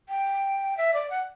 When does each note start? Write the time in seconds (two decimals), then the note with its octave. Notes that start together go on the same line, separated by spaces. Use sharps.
0.09 G5
0.77 E5
0.94 D5
1.10 F#5